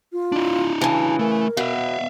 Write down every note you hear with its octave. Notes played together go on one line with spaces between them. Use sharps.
F4
D4 E4
C#3 E3 A5
A3 A#4
B2 E5 F5